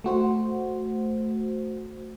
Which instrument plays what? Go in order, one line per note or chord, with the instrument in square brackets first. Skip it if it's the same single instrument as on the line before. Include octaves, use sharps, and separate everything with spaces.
[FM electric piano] A3 F#4 C5